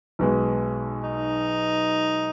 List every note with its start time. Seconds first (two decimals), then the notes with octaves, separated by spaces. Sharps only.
0.19 B1 B2 G#3
1.03 D#4